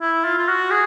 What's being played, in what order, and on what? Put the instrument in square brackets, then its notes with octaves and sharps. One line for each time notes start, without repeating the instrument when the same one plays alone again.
[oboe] E4
F4
F4
F#4
G#4